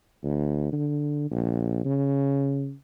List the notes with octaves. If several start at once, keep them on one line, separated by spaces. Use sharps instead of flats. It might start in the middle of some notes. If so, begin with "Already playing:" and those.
D2
D3
A#1
C#3